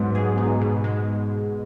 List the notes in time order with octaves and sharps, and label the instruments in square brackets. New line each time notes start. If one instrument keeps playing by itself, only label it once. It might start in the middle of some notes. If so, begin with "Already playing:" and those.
Already playing: [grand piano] G#2 [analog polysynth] F#3 B3
[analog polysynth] G#4
D#4
B2
G#3